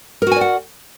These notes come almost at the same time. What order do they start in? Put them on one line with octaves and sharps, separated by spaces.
A#4 F#4 G#5 D5 F#5